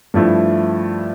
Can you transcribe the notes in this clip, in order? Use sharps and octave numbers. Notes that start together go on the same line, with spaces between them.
G2 F3 A3 E4